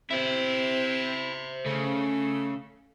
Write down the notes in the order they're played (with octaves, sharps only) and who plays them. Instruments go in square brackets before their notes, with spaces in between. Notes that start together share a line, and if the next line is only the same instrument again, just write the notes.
[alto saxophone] C4 [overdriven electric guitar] E4 [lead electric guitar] C5 E5
[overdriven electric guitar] C#3 [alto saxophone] A3